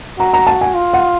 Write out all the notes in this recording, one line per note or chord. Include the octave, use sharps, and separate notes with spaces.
F#4 A#5
A#5
A5
G#5
F4
F#5